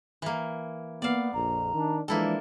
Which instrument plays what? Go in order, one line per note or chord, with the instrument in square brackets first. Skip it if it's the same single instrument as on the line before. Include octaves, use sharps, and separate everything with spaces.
[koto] E3 A#3
[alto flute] A#3 [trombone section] B3 [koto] D5 F5
[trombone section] A#1 F2 [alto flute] A#5
[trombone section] D#3 D4
[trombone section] E3 F3 D4 [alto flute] G#3 [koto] A#3 E4 A4